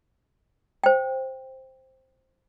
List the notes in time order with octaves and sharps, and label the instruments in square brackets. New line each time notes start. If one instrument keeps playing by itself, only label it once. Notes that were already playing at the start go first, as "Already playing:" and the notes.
[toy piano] C5 G5